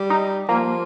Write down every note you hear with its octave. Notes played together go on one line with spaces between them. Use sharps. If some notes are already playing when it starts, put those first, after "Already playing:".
Already playing: G3
D#4
F3 A#3